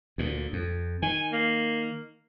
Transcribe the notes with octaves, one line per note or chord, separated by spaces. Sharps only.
D2 A#2
F2
D#3 G#5
A#3